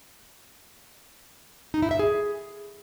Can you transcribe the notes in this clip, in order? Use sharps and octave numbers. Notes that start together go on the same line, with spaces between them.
D#4
E4
E5
G#4